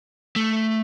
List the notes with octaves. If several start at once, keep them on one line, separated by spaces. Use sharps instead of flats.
A3